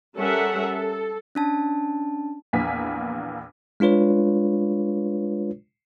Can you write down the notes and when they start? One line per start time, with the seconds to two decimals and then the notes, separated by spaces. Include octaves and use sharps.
0.16 G3 C#4 A4 A#4 E5 F#5
0.61 A4
1.35 C#4 D4 A5
2.53 A#1 E2 A#3 B3 G#5 B6
3.80 G#3 D4 F4 B4 C#5